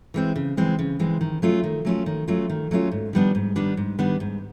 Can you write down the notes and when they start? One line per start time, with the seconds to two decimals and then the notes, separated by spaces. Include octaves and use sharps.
0.14 E3 G#3 C4
0.36 C#3
0.57 E3 G#3 C4
0.79 C#3
0.99 E3 G#3 C4
1.21 D#3
1.42 F#3 A3 C#4 F4
1.64 D#3
1.85 F#3 A3 C#4 F4
2.06 D#3
2.28 F#3 A3 C#4 F4
2.50 D#3
2.71 F#3 A3 C#4 F4
2.91 G#2
3.13 D#3 G3 B3 D4
3.35 G#2
3.56 D#3 G3 B3 D4
3.77 G#2
3.99 D#3 G3 B3 D4
4.20 G#2